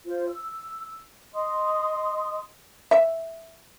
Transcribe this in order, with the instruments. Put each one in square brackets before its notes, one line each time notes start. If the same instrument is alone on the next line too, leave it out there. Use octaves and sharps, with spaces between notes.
[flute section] F4 C5
E6
D#5 C6 D#6
[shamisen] E5